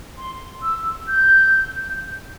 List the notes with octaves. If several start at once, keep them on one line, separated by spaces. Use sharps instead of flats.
C6
E6
G6